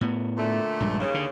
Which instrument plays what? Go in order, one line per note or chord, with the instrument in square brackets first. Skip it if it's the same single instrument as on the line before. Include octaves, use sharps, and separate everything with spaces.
[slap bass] A2 B3
[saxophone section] A#2 D3 A3
[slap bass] A#1 G2 G#3
[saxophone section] D#2 C#3
[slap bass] D3